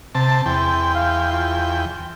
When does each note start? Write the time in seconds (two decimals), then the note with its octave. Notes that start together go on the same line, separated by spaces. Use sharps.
0.15 C3 A5
0.46 E2 G5 C6
0.95 F5
1.32 F4